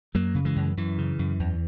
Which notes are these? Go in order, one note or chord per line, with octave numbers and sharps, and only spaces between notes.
F#2 F#3 A#3
C#3
E3 G#3
F#2
F#2 E3
C#3
F#2
E2